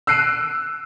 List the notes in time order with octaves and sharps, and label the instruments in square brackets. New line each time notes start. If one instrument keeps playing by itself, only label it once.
[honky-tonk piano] E6 F#6 C7 D7 D#7